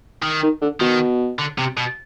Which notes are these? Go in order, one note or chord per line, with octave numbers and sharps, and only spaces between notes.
D#3
D#3
D3
B2 D#3
D3
C3
B2